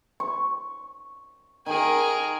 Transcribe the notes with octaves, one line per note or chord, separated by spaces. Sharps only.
C#6
D#3 G#4 A#4